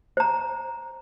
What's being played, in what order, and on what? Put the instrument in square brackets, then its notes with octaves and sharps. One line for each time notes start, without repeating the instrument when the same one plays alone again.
[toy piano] C5 A#5